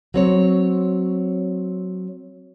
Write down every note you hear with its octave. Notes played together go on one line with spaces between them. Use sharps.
F#3 C4 C#5